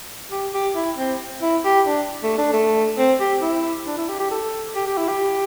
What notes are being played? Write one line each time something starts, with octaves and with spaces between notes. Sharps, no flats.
G4
G4
E4
C4
E4
G4
D4
A3
D4
A3
C4
G4
E4
D4
E4
G4
G4
A4
G4
G4
E4
G4